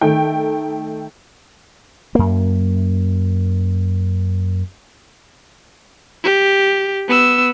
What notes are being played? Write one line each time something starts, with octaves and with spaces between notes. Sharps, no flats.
D#3 A3 G5
F#2 A#3
G4
B3 E6